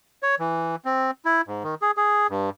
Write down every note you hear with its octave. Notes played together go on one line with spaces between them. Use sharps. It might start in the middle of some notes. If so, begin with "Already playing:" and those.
C#5
E3
C4
E4
G#2
D#3
G#4
G#4
G2